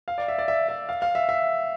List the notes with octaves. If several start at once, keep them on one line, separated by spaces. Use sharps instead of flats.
F5
D5
E5
D5
E5
E5
F5
F5
E5
E5